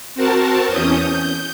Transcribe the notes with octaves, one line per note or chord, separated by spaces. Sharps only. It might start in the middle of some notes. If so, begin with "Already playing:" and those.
C4 F#4 A#4 A5
E2 E3 C#4 D#6 G6
G6